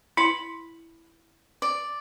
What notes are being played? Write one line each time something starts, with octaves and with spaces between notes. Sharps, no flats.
E4 B5 C6
D5